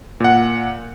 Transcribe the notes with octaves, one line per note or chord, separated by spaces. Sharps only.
A#2 F#5